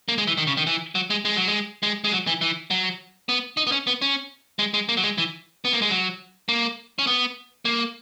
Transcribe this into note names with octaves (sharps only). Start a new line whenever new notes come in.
A#3
G#3
E3
D#3
C#3
D#3
E3
F#3
G#3
G#3
F#3
G#3
G#3
G#3
F#3
E3
E3
F#3
B3
D#4
B3
C#4
B3
C#4
G#3
G#3
A#3
F#3
G#3
E3
B3
A#3
G#3
F#3
A#3
C#4
B3
A#3